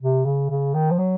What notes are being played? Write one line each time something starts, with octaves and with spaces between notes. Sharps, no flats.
C3
C#3
C#3
D#3
F3
F#3